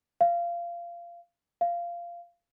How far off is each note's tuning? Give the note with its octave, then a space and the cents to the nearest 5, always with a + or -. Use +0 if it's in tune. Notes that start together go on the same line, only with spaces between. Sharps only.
F5 -20
F5 -15